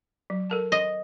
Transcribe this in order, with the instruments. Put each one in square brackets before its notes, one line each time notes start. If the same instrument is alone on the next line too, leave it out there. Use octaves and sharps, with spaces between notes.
[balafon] F#3
A4 A#4 A5
[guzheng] D#5